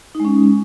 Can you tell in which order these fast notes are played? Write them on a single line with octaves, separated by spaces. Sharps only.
D#4 G#3 C#4